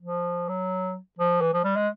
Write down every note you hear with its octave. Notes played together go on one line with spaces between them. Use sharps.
F3
F#3
F3
E3
F3
G3
G#3